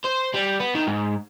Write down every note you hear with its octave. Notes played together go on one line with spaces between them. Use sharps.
C5
G3
B3
D#3
G#2